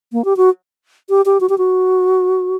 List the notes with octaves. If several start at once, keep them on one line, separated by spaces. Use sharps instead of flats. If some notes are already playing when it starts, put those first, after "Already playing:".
A#3
G4
F#4
G4
G4
F#4
G4
F#4